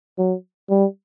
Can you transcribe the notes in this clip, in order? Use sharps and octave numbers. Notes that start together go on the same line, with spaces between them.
F#3
G3